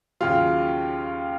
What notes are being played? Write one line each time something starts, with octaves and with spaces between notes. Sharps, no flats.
D#2 C#3 F#3 F4